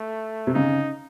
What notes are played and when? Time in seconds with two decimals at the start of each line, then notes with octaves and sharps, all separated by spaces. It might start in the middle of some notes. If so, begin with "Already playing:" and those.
Already playing: A3
0.47 C3
0.54 C#3 D#4